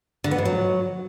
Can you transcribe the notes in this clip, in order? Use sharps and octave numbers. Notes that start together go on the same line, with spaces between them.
D3
B3
G#2
F#3